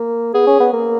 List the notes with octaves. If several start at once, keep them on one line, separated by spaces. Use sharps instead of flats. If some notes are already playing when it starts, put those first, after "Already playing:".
Already playing: A#3
B3 G#4
C#4
B3
A#3